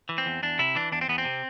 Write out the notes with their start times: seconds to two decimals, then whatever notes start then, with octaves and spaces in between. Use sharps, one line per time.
0.09 E3
0.18 C4
0.26 E2
0.43 E2 D4
0.59 C3 E4
0.75 E3 D4
0.92 E2 D4
1.01 C4
1.08 E2 B3
1.18 C4
1.25 C3